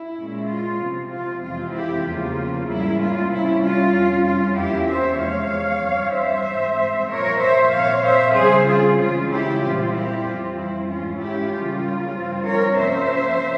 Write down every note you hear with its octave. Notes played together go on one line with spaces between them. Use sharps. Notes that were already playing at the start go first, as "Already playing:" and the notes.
Already playing: E4
A#2 G#3 C#4
F4
C3 F3 C4
F4
F2 C3 E3 G#3 C4 F4
E4 G4
E2 C#3 F3 A#3 F4
G#2 G3 A#3 C#4 E4
F4
C3 G3 C#4 E4
F4
F2 C3 G3 C#4
F4
E2 E3 A#3 C#4 E4 G4
C5 E5
E2 C3 F3 G#3 C#5 F5
G2 E3 G3 C4
C5 E5
G#2 G3 C4
A#2 F3 A#3 A#4 C#5
C5 E5
A#2 F3 C4 C#5 F5
C5 E5
C#3 G3 C4 G#4 C5
F4 G#4
C#3 E3 G#3 C#4 F4
E4 G4
A#2 G3 C4 F4
E4 G4
F2 E3 G3 C4 F4
E4
G#2 E3 G#3 C#4 F4
E4 G4
C#3 G3 A#3 C#4 F4
G2 F3 C4
A#4 C#5
C3 F3 A#3 C#4 C5 E5